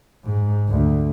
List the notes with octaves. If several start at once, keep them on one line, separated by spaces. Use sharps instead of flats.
G#2
D2